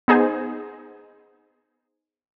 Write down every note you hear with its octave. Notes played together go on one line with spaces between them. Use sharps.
B3 D#4 G#4 C5 G#5